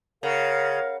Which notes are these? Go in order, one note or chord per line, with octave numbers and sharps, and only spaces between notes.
C#3 A#4 F5 F#5